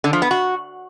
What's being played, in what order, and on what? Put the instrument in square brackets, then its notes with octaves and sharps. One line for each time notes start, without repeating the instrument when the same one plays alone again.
[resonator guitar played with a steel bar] D3
F3
B3
F#4